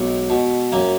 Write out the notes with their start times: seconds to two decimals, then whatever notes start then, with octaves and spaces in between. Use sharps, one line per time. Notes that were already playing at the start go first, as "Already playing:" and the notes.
Already playing: B1 G#3
0.30 B2
0.72 F#2 A#3